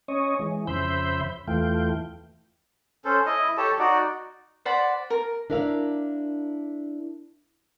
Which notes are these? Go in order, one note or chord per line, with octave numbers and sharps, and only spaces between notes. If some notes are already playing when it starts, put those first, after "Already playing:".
C#4 C#5 D#5
E3 G#3
F2 C#3 C5 E5 B5 G6
E2 E3 A3 F4 G5
C#4 A4 C5
E4 D#5
G4 A4 C#5 A5
D#4 F#4 D5
C5 D5 F#5 B5
A#4
D4 E4 A#4 D5 F5